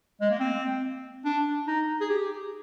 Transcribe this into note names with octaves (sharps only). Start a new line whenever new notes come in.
G#3
A#3
C4
D4
D#4
G#4
G4